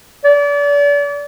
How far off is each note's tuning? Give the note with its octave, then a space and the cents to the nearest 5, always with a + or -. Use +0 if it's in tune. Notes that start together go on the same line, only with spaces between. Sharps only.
D5 -35